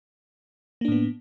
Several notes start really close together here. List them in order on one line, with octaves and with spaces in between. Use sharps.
A#3 D4 A2 B3